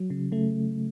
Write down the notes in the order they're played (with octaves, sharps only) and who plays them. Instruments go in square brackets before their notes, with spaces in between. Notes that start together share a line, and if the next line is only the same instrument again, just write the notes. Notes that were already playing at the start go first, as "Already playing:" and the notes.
Already playing: [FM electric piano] F#3
C#3
C#3 A3